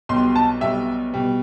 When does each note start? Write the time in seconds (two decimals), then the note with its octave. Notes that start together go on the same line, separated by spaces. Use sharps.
0.09 B1 B2 G3 C6
0.36 A5
0.61 B1 B2 G3 E5
1.14 B2 G3